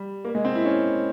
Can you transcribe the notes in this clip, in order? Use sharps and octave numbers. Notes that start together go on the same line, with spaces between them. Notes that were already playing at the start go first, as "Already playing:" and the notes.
Already playing: G3
A#3
G#3
C4
E4
C#4